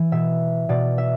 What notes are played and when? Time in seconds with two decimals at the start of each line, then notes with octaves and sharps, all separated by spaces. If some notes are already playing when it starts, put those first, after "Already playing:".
Already playing: E3
0.12 B2 E5
0.69 B2 D5
0.98 E5